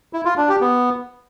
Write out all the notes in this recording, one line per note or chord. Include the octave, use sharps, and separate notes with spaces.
E4
F4
D4
G4
B3